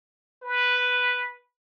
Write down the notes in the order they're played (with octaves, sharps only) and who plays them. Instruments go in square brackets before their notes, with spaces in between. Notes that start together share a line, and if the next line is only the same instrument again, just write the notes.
[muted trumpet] B4